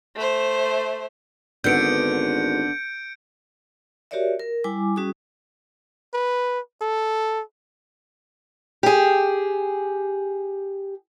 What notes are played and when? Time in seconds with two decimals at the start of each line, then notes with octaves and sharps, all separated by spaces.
0.16 A3 C5
1.64 G#1 D3 B3 G6 C#7 D7
4.11 F#4 G4 A#4 C#5 D5 E5
4.39 A#4
4.64 G3 E4 G#5 D6
4.96 G3 C#4 F#4 G#4 D#6
6.14 B4
6.81 A4
8.83 G4 G#4